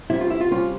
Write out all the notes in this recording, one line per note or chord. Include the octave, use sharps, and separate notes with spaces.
C3 G3 C#4 E4
F4
E4
F4
C3 G3 C#4 F4